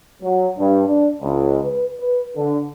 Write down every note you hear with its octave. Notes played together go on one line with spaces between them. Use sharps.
F#3
G2
D4
C#2
B4
B4
D3